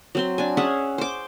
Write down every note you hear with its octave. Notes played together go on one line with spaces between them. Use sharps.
F#3 C4 C6
D4 G#5
C#4 G#4 E5 F#5
C5 D6